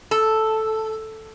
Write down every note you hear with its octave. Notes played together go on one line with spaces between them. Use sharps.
A4